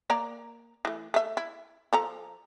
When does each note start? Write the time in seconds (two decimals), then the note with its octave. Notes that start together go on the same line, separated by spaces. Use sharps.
0.10 A#3 D5 A#5
0.85 E3 A3
1.14 A3 E5
1.37 E4
1.93 F3 A4 A#5